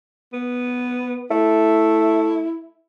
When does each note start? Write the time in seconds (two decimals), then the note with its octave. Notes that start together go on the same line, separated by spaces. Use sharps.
0.33 B3
1.31 A3 E4